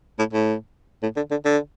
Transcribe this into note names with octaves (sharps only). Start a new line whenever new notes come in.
A2
A2
A2
D3
D3
D3